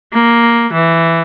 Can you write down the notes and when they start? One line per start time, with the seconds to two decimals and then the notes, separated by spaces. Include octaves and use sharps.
0.13 A#3
0.73 E3